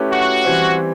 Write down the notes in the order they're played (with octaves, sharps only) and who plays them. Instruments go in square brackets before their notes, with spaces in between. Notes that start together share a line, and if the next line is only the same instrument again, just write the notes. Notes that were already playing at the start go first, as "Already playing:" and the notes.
Already playing: [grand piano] A3 C#4 E4 G4 B4
[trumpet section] F#4
[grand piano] E3 G3 C4 E4